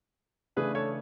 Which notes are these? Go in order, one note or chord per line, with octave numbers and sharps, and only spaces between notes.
C#3 E3 A3 D4 G#4 B4
A4 C#5